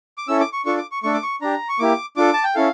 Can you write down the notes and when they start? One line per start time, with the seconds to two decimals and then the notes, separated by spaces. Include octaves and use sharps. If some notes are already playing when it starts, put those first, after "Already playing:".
0.18 D6
0.28 C#4 E4 A4 E6
0.40 D6
0.53 C#6
0.66 D4 F4 A4 C#6
0.78 D6
0.92 C#6
1.03 A3 D4 A4 C#6
1.14 D6
1.23 C#6
1.41 D4 G4 A#5
1.69 C#6
1.79 A#3 E4 G4 D6
2.16 D4 F4 A4 D6
2.33 A5
2.44 G5
2.55 C#4 E4 A4 F5